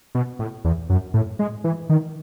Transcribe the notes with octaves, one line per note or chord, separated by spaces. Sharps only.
B2
A2
E2
F#2
A2
G#3
E3
D#3